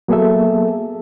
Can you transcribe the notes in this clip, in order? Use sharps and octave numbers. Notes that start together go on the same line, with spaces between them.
F#3 A#3 B3 G#4 A4 E5